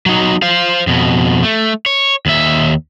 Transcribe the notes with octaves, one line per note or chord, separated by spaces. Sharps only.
F#3 D#4
C5 F5
F2 B2
A3
C#5
D#2 E5